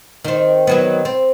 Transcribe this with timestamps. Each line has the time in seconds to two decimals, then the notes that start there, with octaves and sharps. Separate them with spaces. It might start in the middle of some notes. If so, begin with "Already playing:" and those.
0.24 D#3 C4
0.67 D#3 F#3 B3
1.05 C4